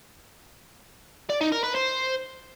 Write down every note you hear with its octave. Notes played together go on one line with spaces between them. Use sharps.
D5
D#4
A#4
B4
C5